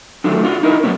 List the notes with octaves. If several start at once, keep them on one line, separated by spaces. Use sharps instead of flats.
F#2 D3 D#3 F#3 A3 F4
D4 F4 F#4
D#4 E4 A#4 B4 D#5 E5
F#3 G3 A#3 B3 C#4